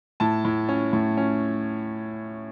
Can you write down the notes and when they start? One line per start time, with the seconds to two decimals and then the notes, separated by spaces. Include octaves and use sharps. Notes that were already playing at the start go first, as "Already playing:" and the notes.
0.20 A2 A5
0.45 A2
0.69 C#4
0.93 A2
1.17 C#4